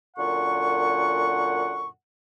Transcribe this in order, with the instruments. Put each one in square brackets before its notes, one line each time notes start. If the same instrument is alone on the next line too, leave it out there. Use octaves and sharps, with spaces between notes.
[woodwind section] F#2 A#2 D3 F#5 C#6